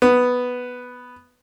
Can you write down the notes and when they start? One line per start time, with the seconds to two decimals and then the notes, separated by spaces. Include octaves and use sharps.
0.02 B3